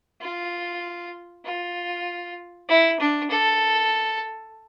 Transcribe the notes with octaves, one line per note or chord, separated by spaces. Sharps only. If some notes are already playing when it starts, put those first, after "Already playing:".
F4
F4
E4
D4
A4